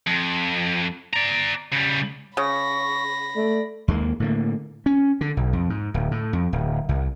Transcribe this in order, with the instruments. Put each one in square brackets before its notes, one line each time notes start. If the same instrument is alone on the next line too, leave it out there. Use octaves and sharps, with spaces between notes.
[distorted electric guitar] F2
D5 A#5
C#3 G3
[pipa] C#3 [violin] B5 A#6 [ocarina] C#6
[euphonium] A3 [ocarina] D5
[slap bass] D#2 G#3 A#3
A2 D3 A#3
C#4
D3
B1
F2
G#2
D1
A2
F2
D1
C2